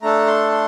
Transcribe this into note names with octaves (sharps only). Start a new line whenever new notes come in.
A3 D4 A4 A#5
C6
C6